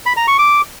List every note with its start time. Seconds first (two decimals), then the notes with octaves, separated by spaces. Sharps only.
0.06 B5
0.17 A#5
0.28 C#6
0.38 D6